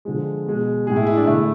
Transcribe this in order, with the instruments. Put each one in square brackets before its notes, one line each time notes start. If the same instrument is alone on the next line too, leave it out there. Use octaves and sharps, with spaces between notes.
[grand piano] D3 F3 G#3
B2 G#3
A2 G#3 G#4
E4
E4
D4
D3 A3 E4